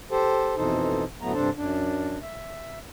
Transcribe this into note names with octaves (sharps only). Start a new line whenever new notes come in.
G4 A4 C5
F2 B2 E3 D#4 A4 C5
D2 A2 F#3 A3 B3 A#5
G2 C3 D4 A4 C5 A5
F#2 D4
E5